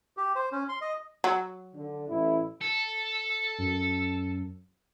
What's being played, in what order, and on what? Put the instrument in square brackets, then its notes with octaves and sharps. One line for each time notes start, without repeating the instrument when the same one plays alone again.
[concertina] G4
C5
C#4
C6
D#5
[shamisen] F#3
[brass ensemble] D3
A1 E4
[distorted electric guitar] A4
[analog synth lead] F#2